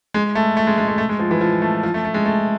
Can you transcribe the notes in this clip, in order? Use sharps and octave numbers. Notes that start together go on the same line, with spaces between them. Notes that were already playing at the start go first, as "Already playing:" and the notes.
G#3
A3
A3
G#3
G#3
A3
A3
G#3
F3
E3
F3
A3
F3
A3
A3
G#3
A3